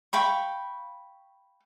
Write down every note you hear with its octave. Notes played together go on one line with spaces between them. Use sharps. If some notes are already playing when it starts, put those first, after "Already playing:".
F5 G5 B5 C#6